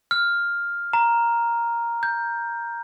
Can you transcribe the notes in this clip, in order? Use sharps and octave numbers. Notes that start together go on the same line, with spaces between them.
F6
A#5
G6